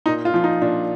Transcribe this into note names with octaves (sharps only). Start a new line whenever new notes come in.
A#2 D#4
F4
F3
D#4
A#2 D4